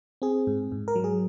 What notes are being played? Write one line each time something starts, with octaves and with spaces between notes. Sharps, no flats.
C4 G#4
G#2
G#2
A#4
F#3
G#4